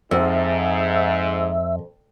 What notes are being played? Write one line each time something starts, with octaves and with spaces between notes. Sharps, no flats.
F2 G#2 E5